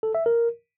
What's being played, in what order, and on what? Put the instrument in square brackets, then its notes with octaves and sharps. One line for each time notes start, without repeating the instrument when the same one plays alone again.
[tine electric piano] A4
E5
A#4